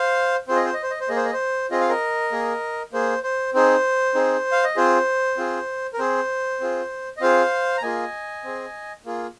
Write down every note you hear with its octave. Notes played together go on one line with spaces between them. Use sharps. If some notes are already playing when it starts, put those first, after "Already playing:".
Already playing: C5 F5
C4 F4 G#4 C5
D#5
C5
D#5
C5
D#5
C5
A#3 G#4 D#5
C5
D#5
C5
C4 F4 G#4 D#5
F5
A#4 D#5
A#3 G#4
A#3 G#4 C5
C5
C4 D#4 G#4 C5
C4 D#4 G#4
F5
D#5
C4 F4 G#4 C5
C4 F4 G#4
A#4
C4 G#4 C5
C4 F4 G#4
D#5
C4 F4 G#4 C5 F5
A#5
A#3 F4 G#4 D#5 G#5
C4 G#4
A#3 F4 G#4